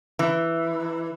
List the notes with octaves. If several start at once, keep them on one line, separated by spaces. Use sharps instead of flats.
E3